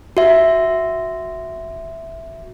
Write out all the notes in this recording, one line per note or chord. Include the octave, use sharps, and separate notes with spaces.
F#4 E5